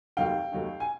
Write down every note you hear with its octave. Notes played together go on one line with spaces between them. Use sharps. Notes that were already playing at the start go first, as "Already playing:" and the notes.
F1 D#2 D#3 F#3 A3 F5 G5
F1 D#2 D#3 F#3 A3
G#5